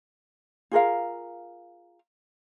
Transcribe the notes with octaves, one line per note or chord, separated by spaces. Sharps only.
F4 G#4 A#4 F5